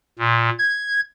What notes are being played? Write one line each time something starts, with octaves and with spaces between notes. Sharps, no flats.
A#2
G#6